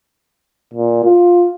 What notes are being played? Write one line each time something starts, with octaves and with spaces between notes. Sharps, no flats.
A#2
F4